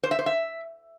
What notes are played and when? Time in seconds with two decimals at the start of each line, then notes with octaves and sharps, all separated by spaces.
0.03 C5
0.11 E5
0.19 C5
0.26 E5